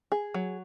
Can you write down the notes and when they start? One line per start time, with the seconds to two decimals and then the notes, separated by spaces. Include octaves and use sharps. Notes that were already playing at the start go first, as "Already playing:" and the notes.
0.12 G#4
0.34 F#3